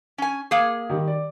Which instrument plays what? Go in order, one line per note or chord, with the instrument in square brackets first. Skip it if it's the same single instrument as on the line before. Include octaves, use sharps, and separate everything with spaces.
[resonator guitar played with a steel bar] C#4 G#5
A#3 G#4
[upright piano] D#3 G3
D5